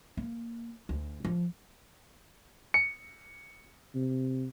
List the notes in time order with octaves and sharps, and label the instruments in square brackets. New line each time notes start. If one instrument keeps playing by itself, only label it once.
[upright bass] A#3
D2
F3
[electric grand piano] C#7
[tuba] C3